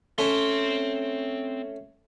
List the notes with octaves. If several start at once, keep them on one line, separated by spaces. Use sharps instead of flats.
A3 C4 C#4 C6